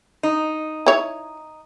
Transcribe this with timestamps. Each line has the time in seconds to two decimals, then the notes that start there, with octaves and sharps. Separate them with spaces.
0.23 D#4
0.86 E4 C#5